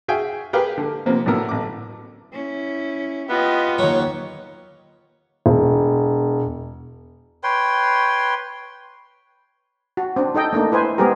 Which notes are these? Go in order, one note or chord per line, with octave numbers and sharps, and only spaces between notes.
F#4 G#4 E5 F5 G5 G#5
G4 G#4 A#4 B4 F5 G5
D3
C3 F3 A#3 B3
A2 D3 F#3 B3 A#4 E6
A1 D6
C#4 E4
B3 F4 G4 D#5
D#2 F#3 C#5
E1
B4 C#5 G5 C6
F#4
C4 D4
D#4 A4 D#5 G5
A3 A#3 D4 D#4
E4 B4 C5 G#5
G#3 B3 C4 G4 G#4 A#4